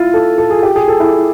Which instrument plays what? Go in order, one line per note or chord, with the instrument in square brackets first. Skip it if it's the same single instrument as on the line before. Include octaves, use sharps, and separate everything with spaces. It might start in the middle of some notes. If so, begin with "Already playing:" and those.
Already playing: [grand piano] E4 F4
A4
A4
G#4
G4
G#4
A4
E4